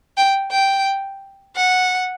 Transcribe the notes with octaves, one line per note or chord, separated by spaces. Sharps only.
G5
G5
F#5